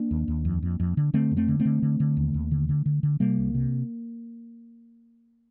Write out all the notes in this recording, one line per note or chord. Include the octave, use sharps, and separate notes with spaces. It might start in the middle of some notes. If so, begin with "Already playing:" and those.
Already playing: A#3 D4
D#2
D#2
F2
F2
F2
D3
D3 A3 C4
F2
A3 C4
D3
A3 C4
D3
D3
D3
D#2
D#2
D3
D3
D3
D3
C3 G3 A#3
C2
C3